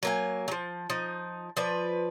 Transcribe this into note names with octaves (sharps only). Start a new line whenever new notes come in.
F#3 A#3 G#5
F3 F#3
F3 D#4
F3 B4 D5